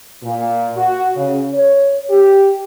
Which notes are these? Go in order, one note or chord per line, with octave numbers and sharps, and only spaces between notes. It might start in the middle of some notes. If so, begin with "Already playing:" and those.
A#2
F#4
C#3
C#5
G4